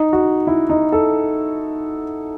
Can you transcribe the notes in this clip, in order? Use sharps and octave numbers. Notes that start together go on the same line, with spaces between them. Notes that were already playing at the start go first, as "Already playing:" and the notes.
Already playing: D#4
F#4
E4
D#4
A4